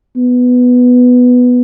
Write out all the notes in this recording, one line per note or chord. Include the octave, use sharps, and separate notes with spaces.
B3